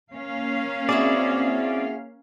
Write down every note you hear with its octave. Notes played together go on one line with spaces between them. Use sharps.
A#3 C#4 F5
C4 E4 F#4 G#4 D5